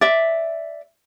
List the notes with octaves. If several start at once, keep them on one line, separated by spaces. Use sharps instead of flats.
D5 E5